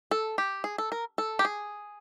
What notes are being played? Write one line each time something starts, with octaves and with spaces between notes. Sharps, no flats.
A4
G4
G#4
A4
A#4
A4
G4
G#4